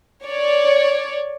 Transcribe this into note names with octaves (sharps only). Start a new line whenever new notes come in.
C#5 D5